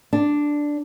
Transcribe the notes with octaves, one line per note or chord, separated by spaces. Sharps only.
D4